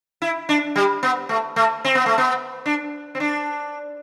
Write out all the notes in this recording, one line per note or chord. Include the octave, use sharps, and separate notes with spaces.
E4
D4
G3
B3
A3
A3
C4
B3
A3
B3
D4
C4
D4